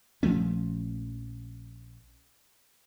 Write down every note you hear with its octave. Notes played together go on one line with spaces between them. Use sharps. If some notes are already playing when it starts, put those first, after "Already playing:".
A#1 F3 A3 C#4